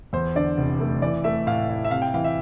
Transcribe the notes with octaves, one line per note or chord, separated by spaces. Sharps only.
E2 C5
D3 D5
F1
A3
E3 D5
A3 E5
A2 F5
E4
E5
C3 F5
G5
E3 F5
E5